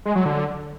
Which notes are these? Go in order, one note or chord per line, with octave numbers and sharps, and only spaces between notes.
G#3
F#3
D3